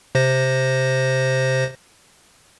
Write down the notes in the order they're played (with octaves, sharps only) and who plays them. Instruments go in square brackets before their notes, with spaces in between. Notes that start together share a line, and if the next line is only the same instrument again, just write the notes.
[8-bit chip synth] C3 C5 A#6